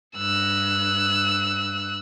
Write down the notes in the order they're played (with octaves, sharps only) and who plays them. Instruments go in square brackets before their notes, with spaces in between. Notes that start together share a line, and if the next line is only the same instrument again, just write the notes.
[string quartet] G2 E6 F#6